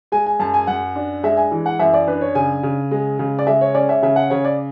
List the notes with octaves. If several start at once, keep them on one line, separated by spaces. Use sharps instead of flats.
G#3 G#5
G#5
F#2 A5
G#5
F#2 F#5
D4
G#3 E5
G#5
E3
F#5
F#2 E5
D5
D4 B4
C#5
C#3 G#5
C#3
G#3
C#3
D5
G#3 E5
C#5
C#4 D5
E5
C#3 E5
F#5
C#3 C#5
D5